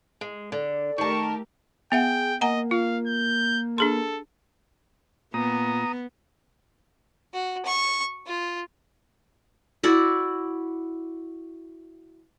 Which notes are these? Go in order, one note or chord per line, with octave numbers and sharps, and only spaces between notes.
G#3
D3 D5
D#3 A3 G4 A#4 A5 C#6
B3 G#4 E5 F#5 G5
A#3 D#5 F#5 G#5 A#5
F4 F5
G6
D4 G#4 A4 C6
A#2 B3 A#5 D#6
F#4
C#6
F4
E4 F#4 D5